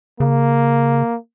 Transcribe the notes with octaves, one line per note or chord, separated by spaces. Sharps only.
C#3 A#3